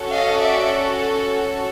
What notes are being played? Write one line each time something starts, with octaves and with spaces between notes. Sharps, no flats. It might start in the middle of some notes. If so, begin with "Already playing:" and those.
Already playing: C#4 F#4 A4
D#5 F5
D5 E5